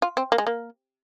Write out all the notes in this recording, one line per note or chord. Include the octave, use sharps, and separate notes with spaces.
F4
C4
A#3
G#3
A#3